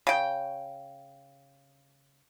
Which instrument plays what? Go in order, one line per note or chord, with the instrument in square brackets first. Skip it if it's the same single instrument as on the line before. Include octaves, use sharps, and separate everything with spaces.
[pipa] C#3 G5